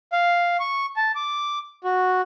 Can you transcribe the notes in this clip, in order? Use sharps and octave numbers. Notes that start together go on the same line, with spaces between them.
F5
C#6
A5
D6
F#4